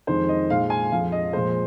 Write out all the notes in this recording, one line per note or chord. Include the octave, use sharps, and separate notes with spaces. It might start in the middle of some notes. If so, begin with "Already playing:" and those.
F2 D#3 G#3 C5
D#5
A#2 G#3 F5
G#5
F2 F3 G#3 F5
D#5
A#2 F3 G#3 C5